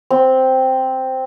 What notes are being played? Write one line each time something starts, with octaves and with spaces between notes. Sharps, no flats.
C4